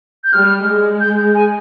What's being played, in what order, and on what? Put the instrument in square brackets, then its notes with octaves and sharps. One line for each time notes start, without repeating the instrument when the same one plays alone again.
[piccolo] G6
[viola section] G3 [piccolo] F6
[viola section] G#3
[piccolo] G6
G#5